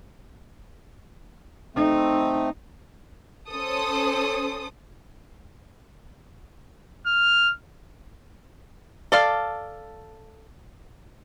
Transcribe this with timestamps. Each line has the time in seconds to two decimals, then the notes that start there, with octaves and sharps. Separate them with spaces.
1.76 A3 C4 D#4
3.51 C#4 A4 C5 D#6
7.07 F6
9.12 A4 D5 F5